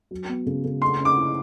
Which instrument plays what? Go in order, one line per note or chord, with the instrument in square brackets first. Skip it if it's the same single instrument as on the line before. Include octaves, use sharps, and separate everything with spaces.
[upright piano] F#3
B3
C#3
C#3
[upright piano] A3 [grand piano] C6
[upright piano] C#4
[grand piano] D6
[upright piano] E4